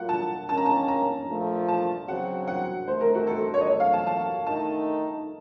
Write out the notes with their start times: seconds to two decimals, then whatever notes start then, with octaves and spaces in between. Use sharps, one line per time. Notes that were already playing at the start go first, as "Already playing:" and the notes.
Already playing: A2 F#3 A#3 F4 F#5
0.09 A5
0.49 D#3 A#3 C#4 A5
0.57 A#5
0.66 A5
0.88 A#5
1.29 A#2 F3 A3
1.68 A5
2.08 C#3 F#3 C4 F#4 F#5
2.47 F#5
2.88 C3 D#3 A3 C5
3.01 A#4
3.15 F#4
3.27 A4
3.54 C#5
3.61 D#5
3.67 C3 F#3 A3 C#5
3.80 F5
3.93 A5
4.07 A5
4.46 D#3 A3 D#4 A5